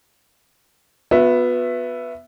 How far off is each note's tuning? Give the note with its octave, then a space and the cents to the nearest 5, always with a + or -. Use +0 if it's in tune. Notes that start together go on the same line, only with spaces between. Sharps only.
B3 +0 F#4 -45 E5 +10